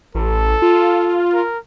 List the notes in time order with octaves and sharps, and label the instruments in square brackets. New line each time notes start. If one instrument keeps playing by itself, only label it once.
[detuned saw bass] A1 [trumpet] A4
[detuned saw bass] F4
[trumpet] A#4